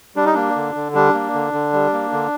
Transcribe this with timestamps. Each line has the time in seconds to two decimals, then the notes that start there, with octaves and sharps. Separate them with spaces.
0.16 G3 D4
0.26 D#4
0.33 A#3 D4
0.56 D3
0.75 D3
0.95 G3 D4
1.14 A#3
1.34 D3
1.53 D3
1.73 G3
1.93 A#3
2.12 D3